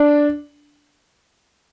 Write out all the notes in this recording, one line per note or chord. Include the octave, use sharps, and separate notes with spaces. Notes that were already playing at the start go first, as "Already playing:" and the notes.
Already playing: D4